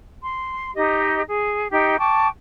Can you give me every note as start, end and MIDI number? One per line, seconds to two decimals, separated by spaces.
0.22 0.70 84
0.75 1.22 63
0.75 1.22 67
0.75 1.22 75
1.27 1.67 68
1.71 1.97 63
1.71 1.97 67
1.71 1.97 79
1.99 2.27 79
1.99 2.27 81
1.99 2.27 85
1.99 2.27 86